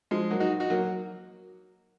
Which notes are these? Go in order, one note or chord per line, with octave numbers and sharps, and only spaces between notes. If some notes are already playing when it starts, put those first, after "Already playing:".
F3 G#3
F#3 A#3
D#4 F#4
D#4 F#4
F#3 A#3